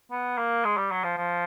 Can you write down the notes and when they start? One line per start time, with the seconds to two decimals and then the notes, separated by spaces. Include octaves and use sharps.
0.11 B3
0.38 A#3
0.65 G#3
0.77 G3
0.91 F#3
1.04 F3
1.17 F3